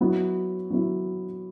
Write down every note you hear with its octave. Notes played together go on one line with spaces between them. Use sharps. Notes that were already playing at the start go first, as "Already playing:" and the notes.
F#3 B3 E4
F#3 B3 E4